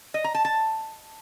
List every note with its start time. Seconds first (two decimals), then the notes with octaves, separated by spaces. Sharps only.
0.14 D#5
0.24 A#5
0.34 A5
0.45 A5